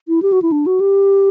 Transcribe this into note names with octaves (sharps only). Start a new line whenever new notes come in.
E4
G4
F#4
E4
D4
F#4
G4